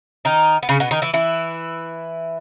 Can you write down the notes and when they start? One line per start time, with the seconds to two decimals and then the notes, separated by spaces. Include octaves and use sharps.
0.25 D#3 D#4
0.63 B3
0.69 C#3 C#4
0.80 B2 B3
0.91 D#3 D#4
1.02 E3 E4
1.13 E3 E4